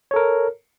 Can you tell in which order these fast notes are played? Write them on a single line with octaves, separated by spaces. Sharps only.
C#5 A4 A#4